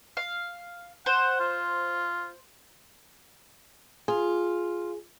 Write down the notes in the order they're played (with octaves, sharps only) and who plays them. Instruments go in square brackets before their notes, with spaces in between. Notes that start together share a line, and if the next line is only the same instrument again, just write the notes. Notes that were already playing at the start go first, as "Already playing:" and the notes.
[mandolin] F5
[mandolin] C5 [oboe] F#5
[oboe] F4
[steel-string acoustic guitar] F4 [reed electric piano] G#4